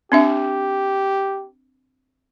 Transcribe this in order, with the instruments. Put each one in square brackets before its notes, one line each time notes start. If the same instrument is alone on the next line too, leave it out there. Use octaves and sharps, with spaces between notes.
[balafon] C4 D4 E5 [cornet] G4